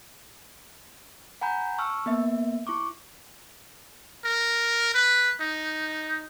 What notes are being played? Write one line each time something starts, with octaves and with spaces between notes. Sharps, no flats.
F#5 G#5 A#5 B5 G6
A5 C#6 E6 F6
A#3 B3 E5
E4 C#6 D6
A#4
B4
D#4